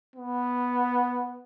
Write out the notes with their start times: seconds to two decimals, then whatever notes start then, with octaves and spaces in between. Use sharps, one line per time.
0.16 B3